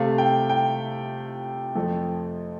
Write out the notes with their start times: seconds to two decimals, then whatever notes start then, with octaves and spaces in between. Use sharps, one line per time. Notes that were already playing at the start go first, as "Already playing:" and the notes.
Already playing: C3 A3 F5
0.18 G5
0.49 G5
1.75 F2 F3 A3